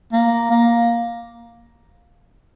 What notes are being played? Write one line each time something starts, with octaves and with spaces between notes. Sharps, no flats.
A#3
A#3